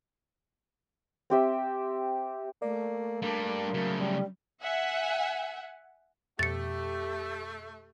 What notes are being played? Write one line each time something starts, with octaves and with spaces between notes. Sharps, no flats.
C4 G4 E5
A3 A#3 D5
G3 A#3 D4
C#3 F#3 A3 A#4
G3
E5 F#5 G#5
F2 B2 A3 G4 A6 C#7